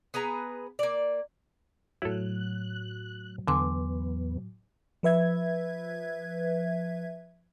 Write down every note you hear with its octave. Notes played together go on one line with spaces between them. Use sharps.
B3 G#4 B4 A#5
A#3 D5
A2 F#3 E4 A4 F#6
E2 D3 B3 G#5 C6 D6
F3 B4 E5 G#6